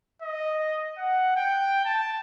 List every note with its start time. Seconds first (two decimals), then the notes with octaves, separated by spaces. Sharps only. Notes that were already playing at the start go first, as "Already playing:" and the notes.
0.22 D#5
0.98 F#5
1.36 G5
1.85 A5